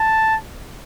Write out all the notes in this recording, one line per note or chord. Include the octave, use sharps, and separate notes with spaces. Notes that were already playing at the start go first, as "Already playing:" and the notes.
Already playing: A5